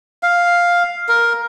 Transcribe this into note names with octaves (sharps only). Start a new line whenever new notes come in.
F5
A#4